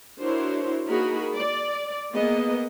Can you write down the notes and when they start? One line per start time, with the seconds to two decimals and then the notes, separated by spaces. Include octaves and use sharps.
0.20 D4 E4 F#4 A#4 C5 C#5
0.88 A#3 D#4 F#4 G#4 A#4 B5
1.35 D5
2.14 A#3 B3 G#4 D#5